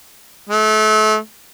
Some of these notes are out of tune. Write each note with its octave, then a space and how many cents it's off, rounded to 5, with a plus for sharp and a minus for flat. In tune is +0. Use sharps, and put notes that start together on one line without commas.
A3 -35